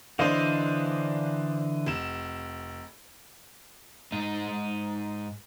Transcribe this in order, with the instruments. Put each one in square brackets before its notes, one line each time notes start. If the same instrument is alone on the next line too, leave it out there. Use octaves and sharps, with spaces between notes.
[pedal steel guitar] D3 E3 D#5 [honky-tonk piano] D4 C5 F5
[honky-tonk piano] F1 E7
[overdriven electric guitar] G#2 D#4